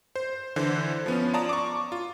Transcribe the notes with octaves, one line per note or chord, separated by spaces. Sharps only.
C5
D3 E3 C5
F3 B3 C#4
F4 D5 A5 A#5 D#6
C#6 D6
F4